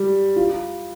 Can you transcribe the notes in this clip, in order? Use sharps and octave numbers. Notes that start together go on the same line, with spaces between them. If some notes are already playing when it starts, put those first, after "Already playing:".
Already playing: G3
F4